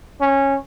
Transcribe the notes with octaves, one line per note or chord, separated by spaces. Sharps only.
C#4